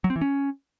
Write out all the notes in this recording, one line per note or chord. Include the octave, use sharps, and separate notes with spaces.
F#3
C4
E3
C#4